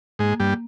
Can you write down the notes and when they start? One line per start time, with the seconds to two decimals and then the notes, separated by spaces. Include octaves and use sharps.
0.19 G#2 G#3 A#3
0.40 G2 G3 A#3